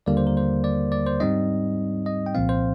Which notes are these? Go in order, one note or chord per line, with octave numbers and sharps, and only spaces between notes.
D#2 D3 G3 A#3 D5
C5
A#4
C5
D5
D5
C5
G#2 G3 C4 D#4 D#5
D#5
G5
C2 A#2 F3 C4 F5
C5